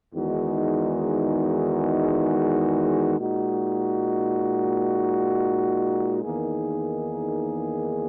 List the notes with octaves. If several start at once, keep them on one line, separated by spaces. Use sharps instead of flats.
E2 D#3 G#3 D#4 F#4
A#2 G#3 D#4 F#4
E2 D#3 A#3 D#4 G#4